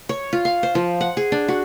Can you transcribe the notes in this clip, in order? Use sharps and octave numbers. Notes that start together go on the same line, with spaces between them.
C#5
F4
F5
C5
F3
F#5
G#4
D4
F#4